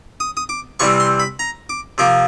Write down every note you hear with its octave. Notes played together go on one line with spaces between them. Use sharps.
D#6
D#6
D6
C3 E3 G3 C4 C#6
C6
B5
A#5
D6
C3 F3 A#3 D6